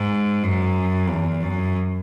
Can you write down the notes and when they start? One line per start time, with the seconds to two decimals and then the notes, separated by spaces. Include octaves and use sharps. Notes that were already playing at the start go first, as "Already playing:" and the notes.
Already playing: G#2
0.44 F#2
1.09 E2
1.42 F#2